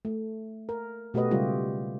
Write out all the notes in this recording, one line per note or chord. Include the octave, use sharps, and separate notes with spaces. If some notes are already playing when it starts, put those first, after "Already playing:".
A3
A#4
B2 A3 F#4 G4 B4 D#5
C#3 G3 G#3 F4 G4